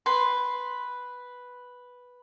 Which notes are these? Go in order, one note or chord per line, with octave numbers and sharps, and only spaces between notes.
B4 C6